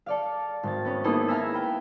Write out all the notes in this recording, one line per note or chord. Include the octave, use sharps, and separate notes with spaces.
A4 D5 F5
G#1 A6
B3 C#4
A#3 B3 D#4 E4 G#4 A4
E5 F5 G#5 A#5 B5 E6
B4 G5